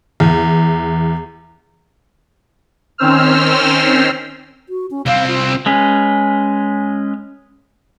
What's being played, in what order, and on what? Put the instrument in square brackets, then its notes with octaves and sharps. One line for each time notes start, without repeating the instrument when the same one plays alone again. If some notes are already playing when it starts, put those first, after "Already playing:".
[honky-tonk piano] E2
[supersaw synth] D#3 C4 C#4 C5 E6 F6
[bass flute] F#4
C#4
[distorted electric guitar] C2 C4 [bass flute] F5
[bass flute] F4
[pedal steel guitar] G#3 C#4 B4